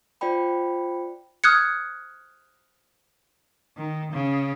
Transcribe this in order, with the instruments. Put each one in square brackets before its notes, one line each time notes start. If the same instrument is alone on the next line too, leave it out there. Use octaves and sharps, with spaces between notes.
[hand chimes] F4 C5 D5 G5 B5
[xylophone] D#6 F6 F#6 G#6 C#7
[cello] D#3
C#3